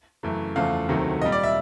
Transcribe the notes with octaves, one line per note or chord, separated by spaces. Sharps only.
F#2 C#3 E3 A3
E2 C#3 F3 A3 F5
D2 C3 D#3 F#3 A3
A#2 G3 D#5
D5
E5